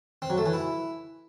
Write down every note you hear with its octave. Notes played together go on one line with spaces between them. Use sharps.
C4
F#3
A3
E3
E4